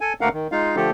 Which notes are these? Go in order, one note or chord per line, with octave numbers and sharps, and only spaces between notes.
A4 G#5
D2 A3 A#3 A#4 F5 F#5
D#3
G#3 D#4 F4 F5
D3 F3 A3 G4 A4